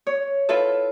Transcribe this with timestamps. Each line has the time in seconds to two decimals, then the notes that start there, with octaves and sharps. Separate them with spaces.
0.07 C#5
0.49 E4 F4 A4 B4 E5